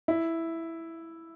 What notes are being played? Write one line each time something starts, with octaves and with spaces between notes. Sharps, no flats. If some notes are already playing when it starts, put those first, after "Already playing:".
E4